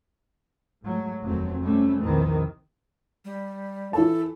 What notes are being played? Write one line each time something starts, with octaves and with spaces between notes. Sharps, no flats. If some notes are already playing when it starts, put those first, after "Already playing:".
G#2 F#3 A3
F1 D#2 F#3 A3 C4
C3 G3 A3 C#4
A#1 E2 C3 D#3 E3 C4
G3
E3 A4 A5